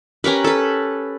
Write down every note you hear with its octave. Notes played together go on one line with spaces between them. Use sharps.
C#4 G4 A#4 B4
A4 B4